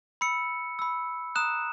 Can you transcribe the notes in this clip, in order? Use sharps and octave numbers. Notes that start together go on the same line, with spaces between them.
B5 E6 C#7
B5 E6
A#5 D#6 F#6 E7